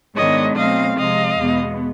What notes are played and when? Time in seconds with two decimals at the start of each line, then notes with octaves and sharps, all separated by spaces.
0.16 G#2 D#3 G#3 B3 D4 C#5 D#5
0.56 B2 F#3 A3 C4 D#5 F5
0.97 C3 F3 G#3 D#5 F5
1.38 E2 B2 G#3 B3